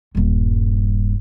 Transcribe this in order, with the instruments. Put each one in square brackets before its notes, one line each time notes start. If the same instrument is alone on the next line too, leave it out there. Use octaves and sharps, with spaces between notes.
[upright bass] D#1 G2